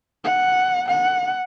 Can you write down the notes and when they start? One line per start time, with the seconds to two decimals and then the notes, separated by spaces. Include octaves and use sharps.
0.24 F#5
0.89 F#5